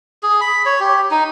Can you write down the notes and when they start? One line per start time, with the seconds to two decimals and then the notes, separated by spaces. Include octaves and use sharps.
0.23 G#4
0.41 B5
0.65 C#5
0.80 G4
1.11 D#4